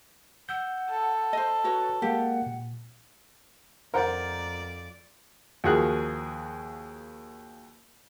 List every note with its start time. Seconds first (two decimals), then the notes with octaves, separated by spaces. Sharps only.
0.49 F#5 E6 G6
0.90 A4
1.33 C5 D#5
1.64 F#4 B4 C#5
2.02 G#3 A#3 G4 F#5
2.46 A#2
3.94 F2 A#4 C5 D5 F#5
5.64 D#2 F3 F#4 G#4 A#4 F#6